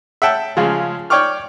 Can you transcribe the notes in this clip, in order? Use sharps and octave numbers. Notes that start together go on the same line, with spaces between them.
E5 F#5 G5 A5
C#3 F3 G#3
C#5 D5 G5 C#6 D6 F6